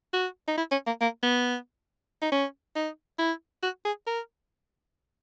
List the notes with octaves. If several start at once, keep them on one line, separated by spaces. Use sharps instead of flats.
F#4
D#4
E4
C#4
A#3
A#3
B3
D#4
C#4
D#4
E4
F#4
G#4
A#4